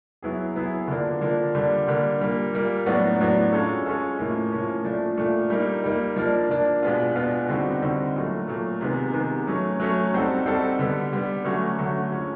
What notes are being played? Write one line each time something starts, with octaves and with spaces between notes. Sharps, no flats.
F#3 B3 E4 G#4
F#3 B3 E4 G#4
D3 F3 A#3 D4
D3 F3 A#3 D4
D3 G3 A#3 D4
D3 G3 A#3 D4
A#2 G3 A#3
A#2 G3 A#3
A2 F#3 B3 D4 F#4
A2 F#3 B3 D4 F#4
G#3 C#4 F4 A4
G#3 C#4 F4 A4
A2 F3 A#3 C#4
A2 F3 A#3 C#4
A#2 F3 A3 D4
A#2 F3 A3 D4
G3 A#3 D#4
G3 A#3 D#4
F3 A#3 D4
F3 A#3 D4
B2 G#3 B3 D4 F4
B2 G#3 B3 D4 F4
D3 G3 C4 D#4 F#4
D3 G3 C4 D#4 F#4
A#2 F#3 A3
A#2 F#3 A3
C3 D#3 G#3 B3
C3 D#3 G#3 B3
F#3 A3 C#4
F#3 A3 C#4
G3 C4 D#4 F#4 A4
G3 C4 D#4 F#4 A4
D3 G3 B3
D3 G3 B3
D3 F#3 A3 C#4 F#4
D3 F#3 A3 C#4 F#4
F3 G#3 C#4